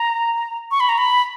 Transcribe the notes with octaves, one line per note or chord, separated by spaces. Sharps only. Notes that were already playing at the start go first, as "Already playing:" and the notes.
Already playing: A#5
C#6
B5
A#5
B5